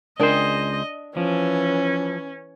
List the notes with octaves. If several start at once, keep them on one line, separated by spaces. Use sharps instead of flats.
C#2 D4 G#4 A#4 C5 D#5 G5
E3 F3 C#4